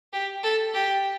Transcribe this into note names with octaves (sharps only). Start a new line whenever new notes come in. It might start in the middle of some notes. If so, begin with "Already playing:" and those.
G4
A4
G4